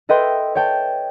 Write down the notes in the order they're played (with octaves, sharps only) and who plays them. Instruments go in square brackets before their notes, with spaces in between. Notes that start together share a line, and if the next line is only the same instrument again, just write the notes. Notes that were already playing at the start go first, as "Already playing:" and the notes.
[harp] A4 B4 D#5 E5 G5 C6
C#5 G5 A5